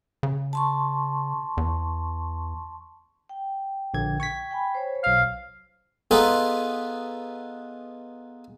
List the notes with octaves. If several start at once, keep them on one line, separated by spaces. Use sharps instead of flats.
C#3
A5 C6 C#6
E2
G5
A#1 D3 G#6
C#6 G#6 B6
G5 G#5 B5
C5 C#5
B1 F5 F6
B3 D#4 F4 G#4 A4 B4